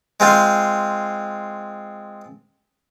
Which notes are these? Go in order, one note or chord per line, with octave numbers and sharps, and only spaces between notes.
G#3 C4 F4